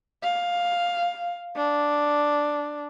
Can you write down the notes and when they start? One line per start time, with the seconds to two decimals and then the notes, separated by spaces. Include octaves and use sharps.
0.23 F5
1.56 D4